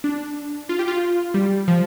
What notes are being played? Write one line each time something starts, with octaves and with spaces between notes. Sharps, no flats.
D4
F4
G4
F4
G3
F3